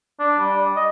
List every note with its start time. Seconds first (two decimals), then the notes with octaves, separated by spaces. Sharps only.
0.19 D4
0.39 G3
0.76 D#5